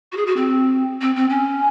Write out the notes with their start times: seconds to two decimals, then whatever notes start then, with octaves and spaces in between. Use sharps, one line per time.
0.12 F#4
0.17 G#4
0.27 F#4
0.37 C4
1.01 C4
1.16 C4
1.30 C#4